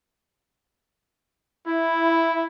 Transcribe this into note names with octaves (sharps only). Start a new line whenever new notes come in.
E4